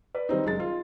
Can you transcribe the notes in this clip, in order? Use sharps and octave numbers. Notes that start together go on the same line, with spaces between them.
B4 D5
D#3 G3 C4 D#4
F#1 G#3 A6
F4